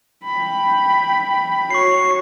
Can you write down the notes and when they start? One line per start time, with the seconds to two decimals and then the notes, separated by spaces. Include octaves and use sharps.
0.24 G5 B5
1.70 F#4 C#5 C#6 C7